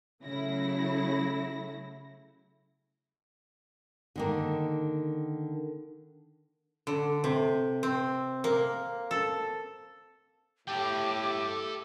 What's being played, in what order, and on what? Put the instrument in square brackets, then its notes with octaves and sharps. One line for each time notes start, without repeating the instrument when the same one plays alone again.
[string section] C#3 F#3 A3 E4 A#6
[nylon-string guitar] D3 D#3 A#3
[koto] D3
C3
C4
A#3
A4
[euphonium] A2 [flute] G4 [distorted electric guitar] A4 G5 [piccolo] D6